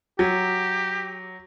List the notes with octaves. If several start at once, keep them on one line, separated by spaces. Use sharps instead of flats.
F#3 G4